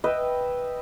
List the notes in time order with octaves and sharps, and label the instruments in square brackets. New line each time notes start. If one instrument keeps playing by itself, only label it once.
[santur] B4 D#5 E5 G5